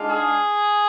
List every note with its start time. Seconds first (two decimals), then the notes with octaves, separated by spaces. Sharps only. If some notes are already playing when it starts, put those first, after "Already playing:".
Already playing: G#2 G#3 D4 F4
0.09 G#4